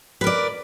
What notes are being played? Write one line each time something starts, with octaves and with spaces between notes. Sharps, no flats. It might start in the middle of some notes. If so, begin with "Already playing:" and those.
A#4 B4 D5